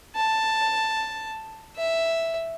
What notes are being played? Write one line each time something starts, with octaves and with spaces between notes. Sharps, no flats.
A5
E5